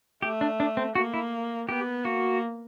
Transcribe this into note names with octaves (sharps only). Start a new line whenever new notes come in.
A3 G4
D4
D4
C4
A#3 F#4
E4
B3 G4
A#3 F#4